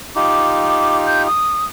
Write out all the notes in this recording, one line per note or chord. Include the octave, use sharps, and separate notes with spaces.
D#4 F4 G4 D6
G6
D#6